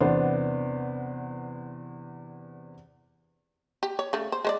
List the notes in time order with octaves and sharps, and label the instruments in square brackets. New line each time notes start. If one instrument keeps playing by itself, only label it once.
[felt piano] E2 C3 B3 D4 C5
[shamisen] G4
C#5
C#3 A3
C5
G#3 C5 D5